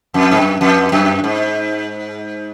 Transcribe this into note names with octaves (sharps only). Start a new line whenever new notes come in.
F2
G#2
F#2
F2
F#2
G#2